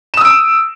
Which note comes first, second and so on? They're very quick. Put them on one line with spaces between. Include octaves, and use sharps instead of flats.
E7 D#6 E6 D7